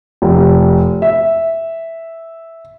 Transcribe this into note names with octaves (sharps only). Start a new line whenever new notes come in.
F1
E5